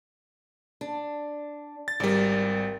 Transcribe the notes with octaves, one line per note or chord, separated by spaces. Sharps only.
D4
A6
G#1 G3 A#4 D5